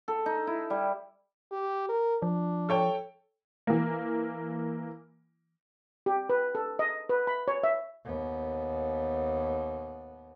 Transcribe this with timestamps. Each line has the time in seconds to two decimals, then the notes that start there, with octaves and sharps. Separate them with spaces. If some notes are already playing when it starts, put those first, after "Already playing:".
0.08 A4
0.26 D#4
0.47 E4
0.70 G3
1.51 G4
1.89 A#4
2.22 F3 D4
2.69 A4 C#5 G5
3.67 E3 A#3
6.06 G4
6.29 B4
6.55 A4
6.79 D#5
7.09 B4
7.27 B5
7.48 C#5
7.63 E5
8.06 D#2 B3